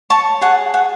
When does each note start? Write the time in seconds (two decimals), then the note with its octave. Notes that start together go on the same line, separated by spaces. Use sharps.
0.10 C#5 A5 C#6
0.41 G#4 F#5 A5
0.74 G#4 F#5